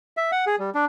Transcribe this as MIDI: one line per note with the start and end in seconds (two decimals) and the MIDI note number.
0.17 0.31 76
0.32 0.45 78
0.47 0.56 68
0.59 0.70 55
0.75 0.85 62